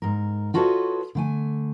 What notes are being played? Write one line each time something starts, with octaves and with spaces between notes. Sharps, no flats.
G#2 A#4
F4 F#4 A4 B4 C#5 D#5
D3 A3 G#5